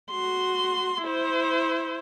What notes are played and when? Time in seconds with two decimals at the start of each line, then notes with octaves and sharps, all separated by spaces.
0.10 F#4 C6
1.04 E4 C5